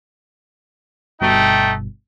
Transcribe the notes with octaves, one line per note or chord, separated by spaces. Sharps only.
G1 G2 B2 A3 D#4 G5